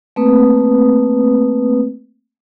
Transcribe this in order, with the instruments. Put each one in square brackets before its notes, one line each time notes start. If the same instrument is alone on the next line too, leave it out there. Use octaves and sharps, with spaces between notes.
[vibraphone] A3 A#3 C4 B4 D#6